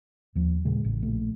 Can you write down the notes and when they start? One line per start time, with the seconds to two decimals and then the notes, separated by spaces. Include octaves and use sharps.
0.35 D#2 F3
0.65 A#2 C#3 G#3
0.84 A1
1.02 A#1 A3